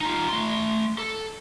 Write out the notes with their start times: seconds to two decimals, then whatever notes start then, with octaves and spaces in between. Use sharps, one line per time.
0.01 D#4 F4
0.29 A3 C6
0.98 A4